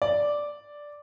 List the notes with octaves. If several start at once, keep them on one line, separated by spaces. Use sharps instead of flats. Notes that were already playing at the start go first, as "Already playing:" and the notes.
D5